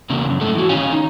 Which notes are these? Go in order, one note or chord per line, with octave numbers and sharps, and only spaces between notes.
E2 C#3 A#3 D4
F#2
G#2 A3 A4
E3 F#4
D#3 C#4 C#5 F5 G#5
D#4